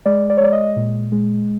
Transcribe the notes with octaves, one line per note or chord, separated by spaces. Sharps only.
G#3 D5
D5
C#5
G#3 D5
D#5
A#2
G#3